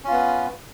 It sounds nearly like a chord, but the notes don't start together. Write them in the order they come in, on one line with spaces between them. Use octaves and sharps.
C#4 F4 B3 B4